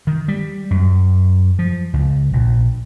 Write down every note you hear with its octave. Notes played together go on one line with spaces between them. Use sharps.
D#3
G3
F#2
F3
C#2
A#1